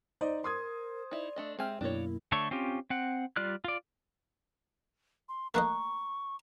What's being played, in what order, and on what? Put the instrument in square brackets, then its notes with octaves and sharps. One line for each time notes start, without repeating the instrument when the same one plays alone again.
[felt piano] D#4 D5 D#5 [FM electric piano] C5
[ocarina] A#4 [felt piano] C6 D#6 G#6
[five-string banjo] D#4 E4 [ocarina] D5
[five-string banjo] A3 D4 D#5
[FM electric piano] G#3 G5 F6 [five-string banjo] C4 G4 G#5 [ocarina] E5
[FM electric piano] F#2 B2 A#3 [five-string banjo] D4 C#5 [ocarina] E4
[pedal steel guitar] D3 A3 A4 C#5 C#6
C4 C#4 F4 G4
C4 F#5
G3 F4 D5 F6 F#6
F4 D5
[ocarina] C6
[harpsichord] A3 A#3 D#5 [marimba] A#5 F#6 [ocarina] C#6